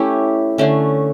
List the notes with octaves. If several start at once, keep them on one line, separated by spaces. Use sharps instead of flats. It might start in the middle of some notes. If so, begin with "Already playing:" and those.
Already playing: A3 C#4 E4 G4
D3 A3 C#4